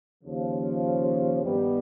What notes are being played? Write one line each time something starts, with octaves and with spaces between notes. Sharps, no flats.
D#2 C#3 F3
G2 D#3 G3 B3